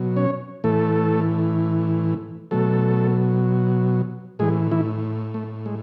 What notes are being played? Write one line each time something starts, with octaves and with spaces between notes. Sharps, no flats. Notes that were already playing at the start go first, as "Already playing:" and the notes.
Already playing: B2 F#3
C#4 C#5
A2 E3 A3 A4
B2 F#3 A3 A4
A2 E3 G#3 G#4
E3 E4
A3
G#3